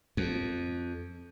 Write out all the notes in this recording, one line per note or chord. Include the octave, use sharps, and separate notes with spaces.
F2